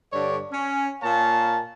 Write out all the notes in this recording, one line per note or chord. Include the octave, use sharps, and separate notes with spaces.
G2 D3 A4 C#5 D5
C#4
A#2 A#3 A#4 C#5 F5 A5